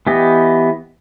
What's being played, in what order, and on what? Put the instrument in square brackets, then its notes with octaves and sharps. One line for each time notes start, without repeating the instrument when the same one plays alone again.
[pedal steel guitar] E3 B3 G4 D#5